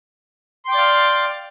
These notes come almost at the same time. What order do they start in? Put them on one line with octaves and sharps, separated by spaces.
C6 G5 D6 D5 F5